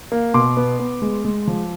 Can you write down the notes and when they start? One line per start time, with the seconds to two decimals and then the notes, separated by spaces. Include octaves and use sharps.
0.12 A#3
0.34 B2 C6 D6
0.57 B3
0.79 B3
1.02 G#3
1.25 G#3
1.47 F3